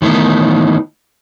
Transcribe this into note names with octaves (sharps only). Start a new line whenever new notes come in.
D#3 E3 A3 B3 D#4